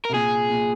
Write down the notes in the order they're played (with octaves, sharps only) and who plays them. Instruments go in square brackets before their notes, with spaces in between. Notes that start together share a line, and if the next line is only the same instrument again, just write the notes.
[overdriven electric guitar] A#4
[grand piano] C3
[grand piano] A#2 [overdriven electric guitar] G#4
[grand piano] A#2